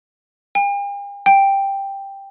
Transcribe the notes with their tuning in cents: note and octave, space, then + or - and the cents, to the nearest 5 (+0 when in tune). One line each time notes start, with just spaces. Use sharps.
G5 +45
G5 +5